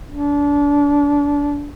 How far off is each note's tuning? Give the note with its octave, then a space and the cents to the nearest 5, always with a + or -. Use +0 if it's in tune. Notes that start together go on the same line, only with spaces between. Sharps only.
D4 -25